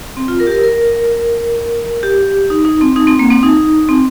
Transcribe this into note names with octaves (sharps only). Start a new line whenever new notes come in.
C4
F4
A#4
G4
A#4
A#4
G4
D#4
D#4
C4
D#4
C4
A#3
C4
D#4
C4